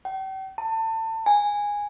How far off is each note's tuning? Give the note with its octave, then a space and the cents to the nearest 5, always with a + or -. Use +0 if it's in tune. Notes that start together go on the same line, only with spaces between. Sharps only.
G5 -40
A5 +30
G#5 -10